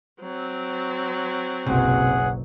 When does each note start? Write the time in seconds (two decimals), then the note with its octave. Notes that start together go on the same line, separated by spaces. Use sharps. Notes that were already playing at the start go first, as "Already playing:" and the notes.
0.21 F#3 C4
1.66 F#1 B1 C3 G#4 F#5